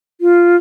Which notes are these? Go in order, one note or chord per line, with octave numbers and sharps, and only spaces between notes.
F4